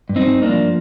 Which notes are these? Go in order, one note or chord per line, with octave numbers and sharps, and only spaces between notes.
G2
C4 D#4
G2
A#3 D4
F3